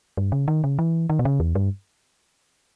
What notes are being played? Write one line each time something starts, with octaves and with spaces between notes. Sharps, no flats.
G2
C#3
D#3
C#3
E3
D#3
B2
C#3
E2
G2